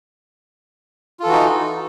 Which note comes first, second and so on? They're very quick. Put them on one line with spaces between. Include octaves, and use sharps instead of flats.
F4 A4 E3 F#4 D#4